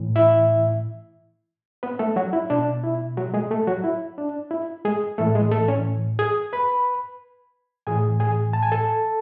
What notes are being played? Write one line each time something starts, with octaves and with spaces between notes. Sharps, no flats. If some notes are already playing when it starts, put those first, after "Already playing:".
Already playing: A2 E3
E4 E5
B3 B4
A3 A4
F#3 F#4
E4
B2 D4
E4
F#3 F#4
G#3 G#4
A3 A4
F#3 F#4
E4
D4
E4
G#3 G#4
A2 E3 A3 A4
G#3 G#4
A3 A4
C#4 C#5
G#4 G#5
B4 B5
A2 E3 G#4 G#5
G#4 G#5
A5
G#5
A4 A5